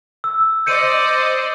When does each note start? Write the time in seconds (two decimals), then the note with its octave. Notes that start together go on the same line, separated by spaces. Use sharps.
0.24 E6
0.66 C5 D5 D#5 G6 C#7 D#7